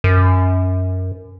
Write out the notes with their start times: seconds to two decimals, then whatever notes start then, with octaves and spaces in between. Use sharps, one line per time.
0.04 F#2